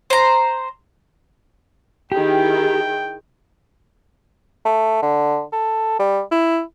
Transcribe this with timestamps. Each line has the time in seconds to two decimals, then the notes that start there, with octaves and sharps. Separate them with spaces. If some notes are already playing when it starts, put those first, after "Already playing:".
0.10 C5 A#5
2.12 D#3 E4 G4 G#4 G5
4.65 A3
5.02 D3
5.52 A4
5.99 G3
6.31 E4